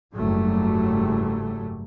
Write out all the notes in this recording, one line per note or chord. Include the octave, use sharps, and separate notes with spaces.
F#1 G#2 F#3 G3 A3